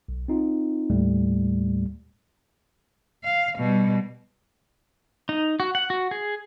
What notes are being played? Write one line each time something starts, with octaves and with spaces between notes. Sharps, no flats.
B1
C4 D#4 F4
D#2 A2 G3 A3
F5
B2 G3
D#4
F#4
F#5
F#4
G#4